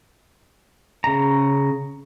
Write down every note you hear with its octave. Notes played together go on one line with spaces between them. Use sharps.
C#3 A#5